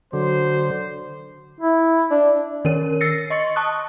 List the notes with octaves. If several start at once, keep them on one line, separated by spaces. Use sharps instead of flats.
D3 F#3 C5
E4
D4
D#3 C#4 A#4 C#5 D#7
E6 A6 A#6 C7 C#7
D#5 C6 C#6 A6 C#7
A5 C#6 D#6 F#6